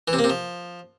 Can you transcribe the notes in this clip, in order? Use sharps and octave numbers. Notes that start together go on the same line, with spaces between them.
E3
C3
A#3
C3
F3